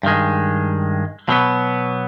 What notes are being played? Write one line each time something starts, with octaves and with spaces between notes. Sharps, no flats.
G2 D#3 G#3
B2 F#3 B3